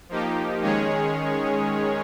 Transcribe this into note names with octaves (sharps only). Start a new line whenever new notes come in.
F3 A#3 D#4 G4
D#3 G#3 C#4 G#4 C#5